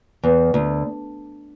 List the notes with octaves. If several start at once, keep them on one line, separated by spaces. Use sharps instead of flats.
E2
D2